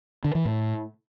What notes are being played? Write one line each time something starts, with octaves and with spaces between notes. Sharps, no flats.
D3
E3
A2